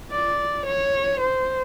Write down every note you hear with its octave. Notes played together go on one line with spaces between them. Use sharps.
D5
C#5
C5